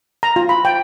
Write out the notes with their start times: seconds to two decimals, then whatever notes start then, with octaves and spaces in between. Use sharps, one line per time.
0.23 A#5
0.36 F4
0.49 B5
0.65 G5